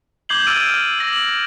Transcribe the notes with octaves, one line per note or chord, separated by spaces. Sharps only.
D6 G6 G#6 C7 F#7 G7
E6 F6 A6 D7 D#7
D6 A#6 F#7
F#7